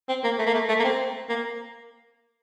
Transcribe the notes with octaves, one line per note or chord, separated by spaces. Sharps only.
C4
A#3
A3
A#3
A3
A3
A#3
C4
A#3